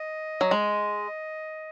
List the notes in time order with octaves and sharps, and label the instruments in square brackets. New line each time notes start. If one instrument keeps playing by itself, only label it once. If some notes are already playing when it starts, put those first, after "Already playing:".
Already playing: [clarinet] D#5
[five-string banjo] F#3
G#3